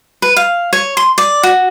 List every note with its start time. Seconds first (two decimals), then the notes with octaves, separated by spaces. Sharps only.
0.22 B4
0.36 F5
0.73 C#5
0.97 C6
1.18 D5
1.43 F#4